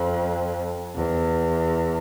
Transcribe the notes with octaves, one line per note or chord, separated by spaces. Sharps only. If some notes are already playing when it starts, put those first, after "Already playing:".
Already playing: F2
E2